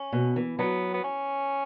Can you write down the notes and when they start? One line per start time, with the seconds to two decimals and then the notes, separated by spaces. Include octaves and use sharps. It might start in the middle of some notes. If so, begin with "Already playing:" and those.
Already playing: C#4
0.12 B2
0.36 E3
0.59 F#3 B3
0.93 B3
1.04 C#4